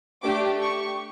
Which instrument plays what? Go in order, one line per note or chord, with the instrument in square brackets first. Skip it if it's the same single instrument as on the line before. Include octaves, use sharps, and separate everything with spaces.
[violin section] A3 D4 G4 D6
C#6